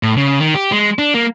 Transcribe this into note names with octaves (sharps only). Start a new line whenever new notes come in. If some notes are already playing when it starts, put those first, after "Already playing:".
A2
C#3
D#3
G4
G#3
D4
A#3